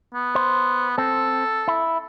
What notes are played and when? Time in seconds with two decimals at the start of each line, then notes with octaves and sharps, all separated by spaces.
0.14 B3
0.35 C5
0.98 C4 A4
1.68 E4